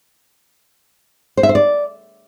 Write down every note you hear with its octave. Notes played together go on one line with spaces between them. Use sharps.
C5
E5
C5
D5